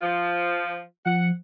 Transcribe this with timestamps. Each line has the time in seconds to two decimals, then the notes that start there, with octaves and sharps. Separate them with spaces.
0.02 F3 F4
1.06 F3 F#5